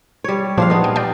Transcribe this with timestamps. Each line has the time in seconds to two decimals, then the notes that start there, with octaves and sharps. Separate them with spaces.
0.24 G3 C#5
0.58 A#2 F3 D4 C5 F5
0.70 B3 D#4
0.84 G5
0.96 D5 G5